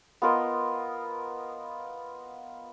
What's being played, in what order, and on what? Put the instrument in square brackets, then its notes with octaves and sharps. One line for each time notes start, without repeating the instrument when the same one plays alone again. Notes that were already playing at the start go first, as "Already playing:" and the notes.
[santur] B3 F4 A#4 D#5